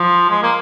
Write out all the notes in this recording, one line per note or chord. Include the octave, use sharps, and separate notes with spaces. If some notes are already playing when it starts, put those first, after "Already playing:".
Already playing: F3
G#3
A#3